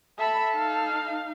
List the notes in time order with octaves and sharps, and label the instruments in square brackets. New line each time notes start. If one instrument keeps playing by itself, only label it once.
[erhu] A4 [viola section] E5 B5
[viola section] D#4 F5